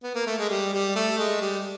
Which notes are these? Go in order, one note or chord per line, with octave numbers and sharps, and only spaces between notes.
B3
A#3
A3
G#3
G3
G3
A3
G#3
G3